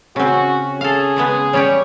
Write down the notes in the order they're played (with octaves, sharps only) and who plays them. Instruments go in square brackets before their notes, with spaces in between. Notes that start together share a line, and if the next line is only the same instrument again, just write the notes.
[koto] C#3 C4 [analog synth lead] C#4 [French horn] F#4
[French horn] G#4 [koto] A4 F5
[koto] C#3 G#3 B3
[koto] G3 C#4 G4 [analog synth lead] C#5